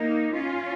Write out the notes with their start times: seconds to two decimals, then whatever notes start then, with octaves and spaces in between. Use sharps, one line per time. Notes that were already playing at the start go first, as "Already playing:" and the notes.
Already playing: A#3 D#4
0.33 C#4 F4